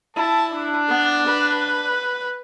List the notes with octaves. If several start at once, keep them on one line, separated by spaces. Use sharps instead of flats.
E4 A5
D4
B3
B4